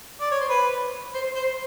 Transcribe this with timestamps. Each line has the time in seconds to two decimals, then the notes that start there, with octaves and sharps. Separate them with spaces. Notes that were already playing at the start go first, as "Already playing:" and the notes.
0.20 D5
0.31 C#5
0.40 C5
0.50 B4
1.14 C5
1.36 C5